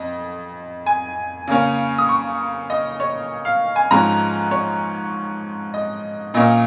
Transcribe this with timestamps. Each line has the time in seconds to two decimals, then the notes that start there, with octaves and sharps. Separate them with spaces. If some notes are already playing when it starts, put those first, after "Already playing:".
Already playing: F2 D#5
0.86 G#5
1.47 C#3 A#3 C#4
1.98 D#6
2.09 C#6
2.70 D#5
3.00 C#5
3.45 F5
3.76 G#5
3.91 G#2 F3 G#3 C#4 A#5
4.51 C#5
5.74 D#5
6.34 A#2 A#3 C#4 D#5